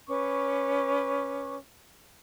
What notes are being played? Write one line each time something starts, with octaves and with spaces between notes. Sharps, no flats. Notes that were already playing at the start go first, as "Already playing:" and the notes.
C#4 B4 C#6 D6